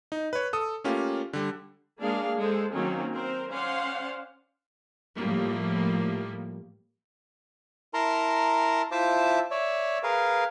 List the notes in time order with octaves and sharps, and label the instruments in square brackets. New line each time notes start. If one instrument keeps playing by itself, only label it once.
[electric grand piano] D#4
B4 C#5
A4 D#6
A3 A#3 C#4 F4 G4
D3 G3
[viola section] G#3 A#3 D4 G#4 F5
G#3 A4 C5
D#3 F#3 A#3 C4 C#4
C4 A#4 C5
C#4 C5 D5 F5 F#5 C6
[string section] A2 F3 G3 A#3
[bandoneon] E4 A#4 A5 A#5 C6
E4 F4 C5 E5 A5 D6
C#5 D5 E5
G#4 A#4 B4 F5